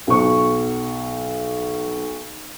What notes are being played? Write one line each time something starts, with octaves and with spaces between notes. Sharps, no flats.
B1 C#6